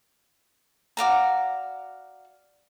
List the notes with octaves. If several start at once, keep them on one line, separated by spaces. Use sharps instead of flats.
F#4 D5 F5 A#5